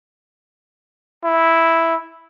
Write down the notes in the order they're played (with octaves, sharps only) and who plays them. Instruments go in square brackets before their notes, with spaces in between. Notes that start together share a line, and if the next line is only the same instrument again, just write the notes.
[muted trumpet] E4